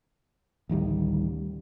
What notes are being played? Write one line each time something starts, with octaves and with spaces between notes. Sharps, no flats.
A1 D2 D#3 G3